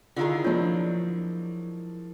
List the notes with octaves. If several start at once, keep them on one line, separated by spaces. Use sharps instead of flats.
D3 D#3 E4 F4 G#4 A#4 F5 A#5
F3 F#3 G#3 D4 F4 C#5 D5